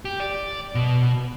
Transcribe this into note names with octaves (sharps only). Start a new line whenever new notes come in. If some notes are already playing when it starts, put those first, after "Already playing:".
G4
D5
B2